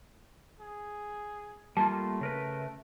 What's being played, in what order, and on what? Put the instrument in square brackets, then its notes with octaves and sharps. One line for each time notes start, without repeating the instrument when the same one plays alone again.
[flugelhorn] G#4
[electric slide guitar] G3 A#3 F4 [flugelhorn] A3 [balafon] A5
[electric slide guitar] C#3 A#4 B4